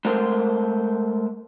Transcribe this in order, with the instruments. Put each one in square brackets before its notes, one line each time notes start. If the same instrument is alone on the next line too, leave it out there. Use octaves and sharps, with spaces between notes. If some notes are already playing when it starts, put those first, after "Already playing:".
[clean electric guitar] G#3 A3 A#4 C5